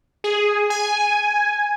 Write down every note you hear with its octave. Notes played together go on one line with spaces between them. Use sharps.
G#4
G#5